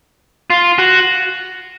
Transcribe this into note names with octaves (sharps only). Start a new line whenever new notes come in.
F4
F#4